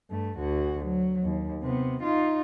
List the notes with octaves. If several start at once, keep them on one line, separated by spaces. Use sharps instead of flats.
G2 A3
D2 F#4
F#3
D#2
C3 B3
D#4 F4